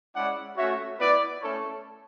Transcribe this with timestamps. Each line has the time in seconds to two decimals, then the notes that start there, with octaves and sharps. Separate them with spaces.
0.15 G#3 C#4 E4 D5 F#5
0.57 A3 C#4 F#4 C#5 E5
1.00 B3 E4 B4 D5
1.41 A3 C#4 E4 A4 C#5